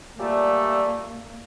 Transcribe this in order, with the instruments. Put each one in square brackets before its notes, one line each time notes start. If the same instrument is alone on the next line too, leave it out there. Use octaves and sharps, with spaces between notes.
[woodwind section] A#2 G3 A3 [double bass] A#3